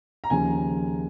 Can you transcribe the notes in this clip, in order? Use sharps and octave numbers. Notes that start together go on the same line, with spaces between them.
A#5
D#2 C#3 F3 G#5